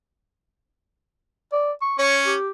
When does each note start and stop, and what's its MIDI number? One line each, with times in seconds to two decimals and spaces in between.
1.52 1.72 74
1.82 1.95 85
1.99 2.33 61
1.99 2.18 73
1.99 2.33 85
2.26 2.51 67